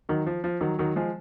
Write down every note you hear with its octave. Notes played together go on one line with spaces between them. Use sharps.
D#3 F#3
F3
F3
D#3 F#3
D#3 F#3
F3 G#3